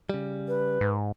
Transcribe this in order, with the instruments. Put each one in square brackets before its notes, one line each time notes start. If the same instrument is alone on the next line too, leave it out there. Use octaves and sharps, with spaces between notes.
[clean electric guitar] C#3 G3
[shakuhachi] B4
[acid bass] G#2